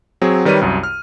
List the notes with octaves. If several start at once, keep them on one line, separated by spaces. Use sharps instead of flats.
F#3 C4 G#4
D#3 G3 B4 C#5 D#7
C2 F#2
F6